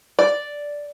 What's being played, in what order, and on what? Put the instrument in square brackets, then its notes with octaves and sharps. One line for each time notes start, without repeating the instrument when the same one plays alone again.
[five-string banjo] D5